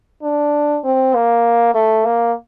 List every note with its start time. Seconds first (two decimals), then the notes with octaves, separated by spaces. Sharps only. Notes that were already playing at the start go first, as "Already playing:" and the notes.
0.23 D4
0.84 C4
1.15 A#3
1.75 A3
2.05 A#3